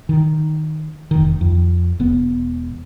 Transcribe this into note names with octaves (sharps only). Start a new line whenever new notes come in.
D#3
F1 D#3
F2
E1 E2 B3